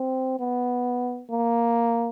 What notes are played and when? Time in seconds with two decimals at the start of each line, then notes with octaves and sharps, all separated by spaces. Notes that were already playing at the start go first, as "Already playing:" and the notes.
Already playing: C4
0.40 B3
1.31 A#3